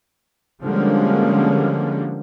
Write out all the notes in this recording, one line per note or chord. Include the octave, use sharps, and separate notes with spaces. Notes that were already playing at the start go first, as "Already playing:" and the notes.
D3 F3 G3 G#3 A#3 C#4